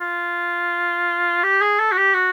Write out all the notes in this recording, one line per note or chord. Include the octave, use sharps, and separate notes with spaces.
F4
G4
G#4
A4
F#4
G4
F#4